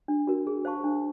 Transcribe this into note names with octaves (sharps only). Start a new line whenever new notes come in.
D4
F#4 A#4
G#4
C5 F5 A5 C#6
D4